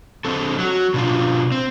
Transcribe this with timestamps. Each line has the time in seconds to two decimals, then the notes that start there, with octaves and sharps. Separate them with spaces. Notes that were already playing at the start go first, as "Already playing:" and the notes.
0.25 D3 C4 A4
0.59 F#3 F#4
0.94 B2 D4 F4
1.52 C4